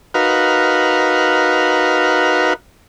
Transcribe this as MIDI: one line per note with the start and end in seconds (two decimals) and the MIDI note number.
0.14 2.54 63
0.14 2.54 66
0.14 2.54 70
0.14 2.54 71
0.14 2.54 77